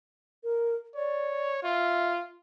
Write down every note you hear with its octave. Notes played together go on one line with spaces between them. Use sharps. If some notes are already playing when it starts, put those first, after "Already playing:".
A#4
C#5 D5
F4 E5